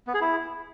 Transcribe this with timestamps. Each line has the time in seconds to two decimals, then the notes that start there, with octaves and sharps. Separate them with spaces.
0.07 B3
0.14 G#4
0.21 E4